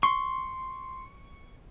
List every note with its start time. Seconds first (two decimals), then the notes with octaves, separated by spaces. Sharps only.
0.03 C6 C#6